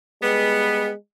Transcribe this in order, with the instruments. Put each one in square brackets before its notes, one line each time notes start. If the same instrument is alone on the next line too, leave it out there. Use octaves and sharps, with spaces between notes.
[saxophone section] G3 B3 [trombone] G#3